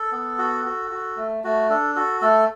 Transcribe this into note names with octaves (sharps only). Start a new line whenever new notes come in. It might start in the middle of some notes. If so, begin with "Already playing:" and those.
Already playing: A4
B3
F#4
F#4
F#4
A3
A3 F#4
D4 A4
F#4 A4
A3 A4